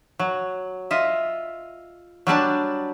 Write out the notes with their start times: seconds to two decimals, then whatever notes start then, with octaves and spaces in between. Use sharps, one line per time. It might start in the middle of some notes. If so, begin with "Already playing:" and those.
0.19 F#3
0.91 F4 D#5 E5
2.27 F#3 G3 D4 A5